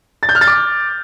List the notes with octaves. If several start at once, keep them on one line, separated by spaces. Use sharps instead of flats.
A6
G6
F6
A6
D6